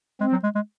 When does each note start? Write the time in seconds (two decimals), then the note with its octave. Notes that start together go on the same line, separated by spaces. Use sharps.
0.21 G#3 C4
0.32 F#3
0.43 G#3
0.55 G#3